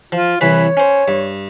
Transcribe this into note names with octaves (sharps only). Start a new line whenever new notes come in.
F3 F4
C2 E3 B4 C#5
C#4 C5
G2